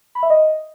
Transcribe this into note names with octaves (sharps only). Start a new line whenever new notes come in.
B5
E5
D#5